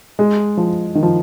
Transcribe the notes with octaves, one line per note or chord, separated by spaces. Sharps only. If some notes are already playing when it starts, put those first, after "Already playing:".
G#3
F3
D#3
F3